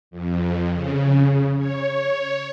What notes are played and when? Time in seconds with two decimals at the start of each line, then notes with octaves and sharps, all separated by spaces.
0.11 F2
0.72 C#3
1.58 C#5